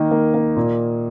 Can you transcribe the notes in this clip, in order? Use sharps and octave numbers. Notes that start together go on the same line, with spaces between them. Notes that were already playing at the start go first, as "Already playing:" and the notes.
Already playing: D#3 A#3 D#5
A#3
A#3
A#2